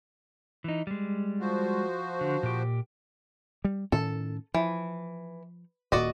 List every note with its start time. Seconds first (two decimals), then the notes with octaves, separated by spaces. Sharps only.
0.64 E3 D#4
0.87 G3 G#3
1.40 F3 F#4 C5
2.21 D3
2.43 A#2 G4
3.65 G3
3.92 A2 D#3 C#4 A4
4.54 E3 F3
5.92 D#1 A#2 F#4 D5 D#5